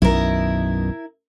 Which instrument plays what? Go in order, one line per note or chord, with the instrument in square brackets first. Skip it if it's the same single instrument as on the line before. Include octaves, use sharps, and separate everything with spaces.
[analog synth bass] B1 [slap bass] F#2 B2 D#3 [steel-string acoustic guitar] E4 A#4